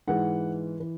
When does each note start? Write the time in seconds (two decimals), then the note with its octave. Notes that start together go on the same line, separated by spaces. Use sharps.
0.07 G#2 E3 F#5
0.80 E3